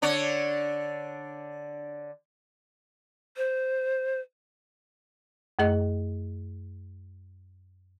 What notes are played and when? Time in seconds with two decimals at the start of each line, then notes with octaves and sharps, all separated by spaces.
0.02 D3 D4 C#5
3.37 C5
5.59 F#2 A3 G#4 D#5